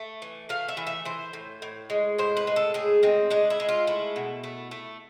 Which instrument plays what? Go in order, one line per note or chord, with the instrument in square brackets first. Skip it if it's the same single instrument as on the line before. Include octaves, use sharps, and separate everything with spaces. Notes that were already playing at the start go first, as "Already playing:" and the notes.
Already playing: [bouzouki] A3 E5
E3
A3 F5
E5
E3
E5
E3 C5
A2
A2
G#3
A2 C5
B4
G#3
A4
A2 G#4
G#3 C4
G#3 D4
E4
G#3
F4
A3 E4
B2
A3
A3